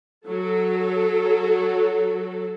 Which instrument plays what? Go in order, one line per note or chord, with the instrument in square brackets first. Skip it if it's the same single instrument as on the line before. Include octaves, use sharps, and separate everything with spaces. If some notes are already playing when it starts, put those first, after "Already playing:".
[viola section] F#3 A4